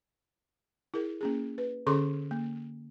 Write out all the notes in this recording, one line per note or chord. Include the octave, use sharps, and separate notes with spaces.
E4 G#4 A#4
A#3 C#4 G#4
B4
D3 C#4 G#4 A4 C6 D6
A#3